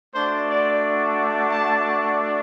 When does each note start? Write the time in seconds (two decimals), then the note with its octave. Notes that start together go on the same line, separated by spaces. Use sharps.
0.15 A3 D4 F#4 C5
0.48 D5
1.49 A5